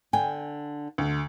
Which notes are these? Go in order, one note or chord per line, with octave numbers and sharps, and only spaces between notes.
D3 G5 G#5
D2